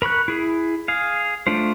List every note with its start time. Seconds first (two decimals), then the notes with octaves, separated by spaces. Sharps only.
0.02 A#4 B5 C#6 F#6
0.28 E4 G#4
0.88 G#4 F5
1.47 A3 D4 F4 C5